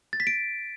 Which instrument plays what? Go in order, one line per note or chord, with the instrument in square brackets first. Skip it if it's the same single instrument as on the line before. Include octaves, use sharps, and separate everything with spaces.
[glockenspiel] A6
B6
D7